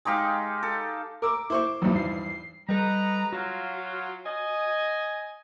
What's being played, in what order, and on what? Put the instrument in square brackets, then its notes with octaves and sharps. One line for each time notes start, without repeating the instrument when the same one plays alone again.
[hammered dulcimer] G#3 D#4 G4 F5
A4
[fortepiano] A#4 E6 [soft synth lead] D6
[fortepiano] E4 C5 C#6
[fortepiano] G#1 E2 G2 [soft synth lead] F#3
[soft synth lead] C7
[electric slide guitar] G3 A4 [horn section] B4 D#5 A#5
[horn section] F#3 F4 [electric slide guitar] F#4
[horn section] D#5 G#5